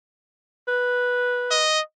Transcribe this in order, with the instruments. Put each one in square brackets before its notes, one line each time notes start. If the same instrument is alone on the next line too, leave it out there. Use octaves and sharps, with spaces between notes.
[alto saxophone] B4
[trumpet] D#5